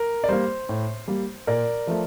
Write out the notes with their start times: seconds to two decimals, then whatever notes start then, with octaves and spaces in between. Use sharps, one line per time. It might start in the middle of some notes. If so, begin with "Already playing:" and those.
Already playing: A#4
0.24 D5
0.28 G3 A#3 C5
0.69 A2
1.08 G3 A#3
1.47 A#2 A#4 D5
1.87 F3 A3